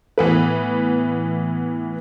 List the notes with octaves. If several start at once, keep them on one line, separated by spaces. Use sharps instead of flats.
A2 E3 B3 B4